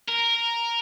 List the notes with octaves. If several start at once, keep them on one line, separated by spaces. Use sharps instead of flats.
A#4